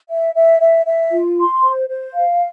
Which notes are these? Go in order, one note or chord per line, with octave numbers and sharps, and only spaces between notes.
E5
E5
E5
E5
F4
C6
C5
C5
F5